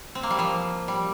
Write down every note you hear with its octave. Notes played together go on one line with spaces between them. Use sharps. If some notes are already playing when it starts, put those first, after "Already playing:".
C4
A#3
G3
F3 A#3
G3